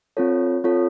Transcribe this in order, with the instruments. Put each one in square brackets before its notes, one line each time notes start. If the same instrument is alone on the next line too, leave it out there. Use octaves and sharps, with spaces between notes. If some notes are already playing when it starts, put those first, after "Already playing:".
[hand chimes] C4 F4 A4 C#5
C4 F4 A4 C#5